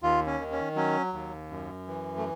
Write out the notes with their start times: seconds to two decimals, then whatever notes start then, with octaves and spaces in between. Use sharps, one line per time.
0.03 D#2 F4
0.26 C#4
0.40 D#3
0.52 C#4
0.76 F#3 C#4
1.13 D#2
1.50 F#2
1.88 E3
2.17 A3